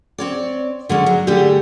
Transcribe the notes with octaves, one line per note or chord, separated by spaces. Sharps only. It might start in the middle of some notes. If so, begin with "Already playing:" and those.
C4 C#5 D5
D3 G#3 C#4
F#3
D3 G3 A3 G4 G#4